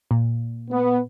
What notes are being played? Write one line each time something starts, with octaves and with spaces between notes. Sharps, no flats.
A#2
B3